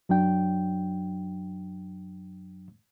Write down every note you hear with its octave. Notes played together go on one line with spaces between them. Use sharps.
F#2 F#3 D4 G5